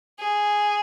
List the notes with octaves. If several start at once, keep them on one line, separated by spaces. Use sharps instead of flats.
G#4